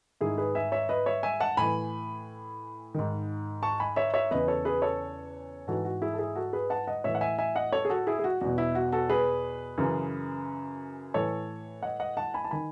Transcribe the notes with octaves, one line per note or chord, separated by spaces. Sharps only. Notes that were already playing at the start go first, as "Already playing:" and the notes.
G#2 D#3 E4 G#4
G#4 B4
E5 G#5
C#5 E5
B4 D#5
C#5 E5
E5 G#5
F#5 A5
A2 E3 G#5 B5
G#2 D#3
A5 C#6
G#5 B5
C#5 E5
C#5 E5
E2 C#3 E3 B4 D#5
A4 C#5
G#4 B4
A4 C#5
G#2 E3 F#4 A4
F#4
E4 G#4
A4
E4 G#4
F#4 A4
G#4 B4
F#5 A5
D#5 F#5
A2 E3 C#5 E5
F#5
E5 G#5
E5 G#5
D#5 F#5
A4 C#5
G#4
F#4 A4
E4 G#4
G#4
F#4
E2 B2 F#4
E4
F#4
F#4 A4
G#4 B4
F#2 C#3 E3
A2 E3 A4 C#5
D#5 F#5
D#5 F#5
F#5 A5
G#5 B5
A5
D#3 G#5 B5